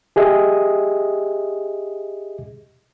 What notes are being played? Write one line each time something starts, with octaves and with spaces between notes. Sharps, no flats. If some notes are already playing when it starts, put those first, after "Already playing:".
G4 G#4 D#5 E5